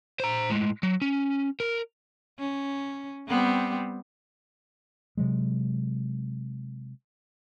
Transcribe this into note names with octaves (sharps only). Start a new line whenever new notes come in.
C5 A#5
A2 G#3
F#3
C#4
A#4
C#4
G3 B3 C4
C3 F#3 G#3